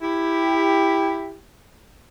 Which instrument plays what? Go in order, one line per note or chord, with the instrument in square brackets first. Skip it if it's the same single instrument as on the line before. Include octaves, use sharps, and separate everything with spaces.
[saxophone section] E4 G4